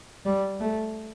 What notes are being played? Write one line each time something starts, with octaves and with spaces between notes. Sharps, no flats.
G3
A3